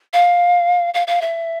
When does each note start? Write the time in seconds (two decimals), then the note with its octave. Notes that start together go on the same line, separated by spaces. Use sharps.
0.13 F5
0.94 F5
1.07 F5
1.21 E5